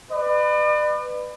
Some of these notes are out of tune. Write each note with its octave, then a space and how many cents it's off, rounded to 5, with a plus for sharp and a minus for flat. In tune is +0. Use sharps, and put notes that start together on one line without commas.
B4 +15 D5 +40